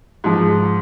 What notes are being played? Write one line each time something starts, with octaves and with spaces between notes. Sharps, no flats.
G#2 F3 G#3